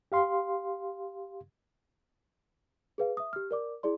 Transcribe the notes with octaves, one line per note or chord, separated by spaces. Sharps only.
G4 F5 C6
G#4 B4 F5
E5 D#6
G4 F6
A#4 D5 D6
E4 G#4 D5 C6